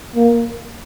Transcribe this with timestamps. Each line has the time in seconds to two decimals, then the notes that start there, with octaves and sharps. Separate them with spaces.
0.16 A#3